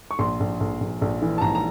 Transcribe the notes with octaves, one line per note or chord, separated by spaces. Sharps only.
C#6
A#1 C6
A#1
A#1
A#1
A#1
E3
A5
A#1 A#5
A#5